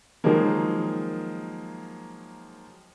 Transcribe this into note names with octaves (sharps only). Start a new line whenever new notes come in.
D#3 F3 F#3 G#3 A#3